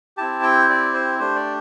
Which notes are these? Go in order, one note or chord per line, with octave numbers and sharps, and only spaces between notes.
C4 E4 G4 A5
G5
D5
C5
A3 D4 G4 C5
D5